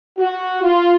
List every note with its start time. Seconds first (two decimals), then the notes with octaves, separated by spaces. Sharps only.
0.19 F#4
0.63 F4